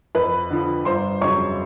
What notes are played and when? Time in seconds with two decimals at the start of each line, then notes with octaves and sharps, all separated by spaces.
0.15 F2 B4 B5
0.50 D3 F3
0.85 G1 C5 C6
1.21 F2 C#3 F#3 C#5 C#6